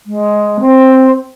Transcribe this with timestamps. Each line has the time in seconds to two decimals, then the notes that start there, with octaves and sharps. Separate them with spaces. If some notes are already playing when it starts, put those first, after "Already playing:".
0.06 G#3
0.60 C4